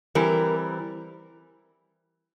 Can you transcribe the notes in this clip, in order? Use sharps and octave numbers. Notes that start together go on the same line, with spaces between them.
E3 G3 C4 A#4